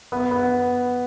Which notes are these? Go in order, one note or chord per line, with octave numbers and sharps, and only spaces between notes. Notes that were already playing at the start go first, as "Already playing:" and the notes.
B3
B3